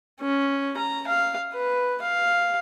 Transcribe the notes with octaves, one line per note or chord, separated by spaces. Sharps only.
C#4
A#5
F5
B4
F5